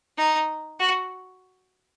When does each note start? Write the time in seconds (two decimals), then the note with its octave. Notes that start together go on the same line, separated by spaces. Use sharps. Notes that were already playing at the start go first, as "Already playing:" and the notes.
0.18 D#4
0.80 F#4